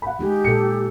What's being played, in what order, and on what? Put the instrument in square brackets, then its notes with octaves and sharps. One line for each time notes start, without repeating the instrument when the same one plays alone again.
[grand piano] F#5 B5
[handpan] G#3 D#4 G#4 [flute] G4
[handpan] A#2 A4 [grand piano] C#7